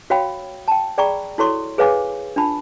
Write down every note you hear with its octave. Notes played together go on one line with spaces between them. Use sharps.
F#4 C#5 F5 G5 B5
G5 A5
G#4 D5 G5 A#5 B5 C#6
E4 F#4 A4 C#5 C6 C#6
G#4 B4 C#5 F5 G#5 D6
D4 F4 A5 B5